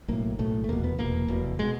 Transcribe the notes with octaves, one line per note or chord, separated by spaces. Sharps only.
B1 A2 A#3
B1 A2 A3
A3
F1 E2 B2 A#3
B3
F1 E2 B2 A#3
F1 E2 B2
B2 G#3